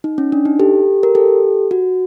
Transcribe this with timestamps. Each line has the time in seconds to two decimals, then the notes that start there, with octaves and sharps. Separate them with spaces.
0.04 D#4
0.18 C#4
0.32 D4
0.45 D#4
0.59 G4 A4
1.03 A#4
1.15 G4 A4
1.71 F#4